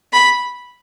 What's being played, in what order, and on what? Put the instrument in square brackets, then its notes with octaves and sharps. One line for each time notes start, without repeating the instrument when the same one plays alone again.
[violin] B5